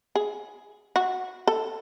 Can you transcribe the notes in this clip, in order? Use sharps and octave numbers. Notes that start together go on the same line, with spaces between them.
G#4
F#4
A4